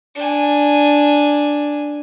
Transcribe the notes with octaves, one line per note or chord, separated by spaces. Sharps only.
D4 G#5